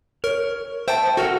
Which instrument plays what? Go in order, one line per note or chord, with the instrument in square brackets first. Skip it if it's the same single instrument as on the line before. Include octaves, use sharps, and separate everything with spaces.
[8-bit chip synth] A#4 [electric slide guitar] C#5
[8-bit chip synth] C5 G5 [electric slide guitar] E5 A5
[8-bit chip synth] F#4 [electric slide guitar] A4 A#4 F#5